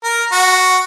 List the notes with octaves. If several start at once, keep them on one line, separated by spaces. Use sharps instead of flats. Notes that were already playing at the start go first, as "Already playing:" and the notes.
A#4
F#4